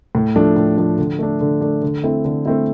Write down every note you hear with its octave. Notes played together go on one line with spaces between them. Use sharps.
A2
F3 A3 D4
A2
F3 A3 D4
D3
A3 D4
D3
A3 D4
D3
A3 C4 E4
D3
A3 C4 E4